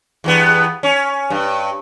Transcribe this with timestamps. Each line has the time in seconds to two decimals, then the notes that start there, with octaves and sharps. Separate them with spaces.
0.24 E2 G2 B3
0.83 C#4
1.30 G2